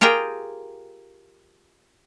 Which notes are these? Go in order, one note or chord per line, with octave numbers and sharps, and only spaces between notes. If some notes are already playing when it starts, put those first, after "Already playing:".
F4 G4 G#4 A#4 G5